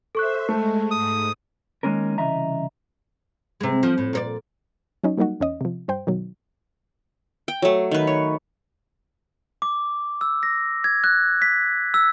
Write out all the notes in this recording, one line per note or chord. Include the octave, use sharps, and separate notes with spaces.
A4 C5 E5 C#6 F#6
G#3 A3
G#2 D#6
D#3 G#3 A#3 C#4 A#4
C2 C#3 E3 D#5 E5 A#5
C3 G#3
F3
A2
A#2 C#5 D5
F#3 C#4 D#4
F#3 G3 A#3 D#4 F#4
E2 C#4 D#5
C3 F3
G2 C5 G5
B2 D#3 F#3
G5
F#3 A3
D#3 B4
C#5
D6
E6
A#6
G#6
F#6
B6
E6